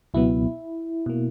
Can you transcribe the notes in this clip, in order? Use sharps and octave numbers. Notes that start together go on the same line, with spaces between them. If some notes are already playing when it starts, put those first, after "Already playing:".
C#2 B2 F#3 B3 E4
B2 A#3